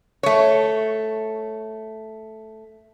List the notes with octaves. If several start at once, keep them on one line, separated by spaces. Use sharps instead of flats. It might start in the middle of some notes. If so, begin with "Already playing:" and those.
A3 C#5